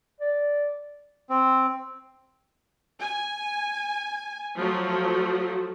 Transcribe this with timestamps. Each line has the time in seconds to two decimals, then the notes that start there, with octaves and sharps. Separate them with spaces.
0.20 D5
1.29 C4
3.00 G#5
4.56 F3 F#3 A3